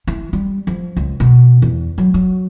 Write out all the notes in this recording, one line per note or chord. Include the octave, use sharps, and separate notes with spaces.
E3
G3
F3
C#2
B2
E2
F#3
F#3